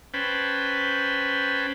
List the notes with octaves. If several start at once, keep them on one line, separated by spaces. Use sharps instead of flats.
C#4 B4 C5 G5 A5 B5